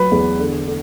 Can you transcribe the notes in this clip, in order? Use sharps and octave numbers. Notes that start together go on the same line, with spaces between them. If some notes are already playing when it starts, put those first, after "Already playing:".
Already playing: F#3 B4
E2
D3
D3